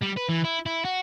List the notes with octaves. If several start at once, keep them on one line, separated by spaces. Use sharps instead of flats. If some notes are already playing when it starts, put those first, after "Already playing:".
G3
B4
E3
E4
E4
F#4